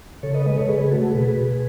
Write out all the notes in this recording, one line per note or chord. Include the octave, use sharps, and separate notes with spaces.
C#3 A4 C#5
B4 D#5
G#3 B4 D#5
A4 C#5
C#3 G#4 B4
A3 F#4 A4
B2 G#4 B4
B2